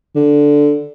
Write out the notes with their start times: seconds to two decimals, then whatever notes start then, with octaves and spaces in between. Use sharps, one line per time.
0.15 D3